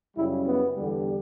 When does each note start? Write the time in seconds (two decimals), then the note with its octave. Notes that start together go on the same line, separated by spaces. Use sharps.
0.16 F#2 C#3 G3 E4
0.47 B3
0.76 E2 D3 G3